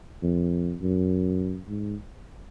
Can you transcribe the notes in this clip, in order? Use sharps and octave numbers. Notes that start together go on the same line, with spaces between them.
F2
F#2
G#2